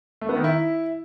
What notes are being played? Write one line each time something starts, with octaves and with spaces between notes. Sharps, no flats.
A3
B3
D#3
E4